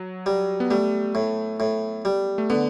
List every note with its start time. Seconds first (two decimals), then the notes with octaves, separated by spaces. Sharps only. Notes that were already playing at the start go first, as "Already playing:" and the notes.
Already playing: F#3
0.26 G3
0.60 B3
0.71 G3 A3
1.15 A2
1.60 A2
2.05 G3
2.38 A3
2.50 D3 B3